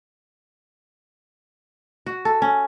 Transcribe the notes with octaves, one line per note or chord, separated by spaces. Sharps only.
F#4
A4
C#4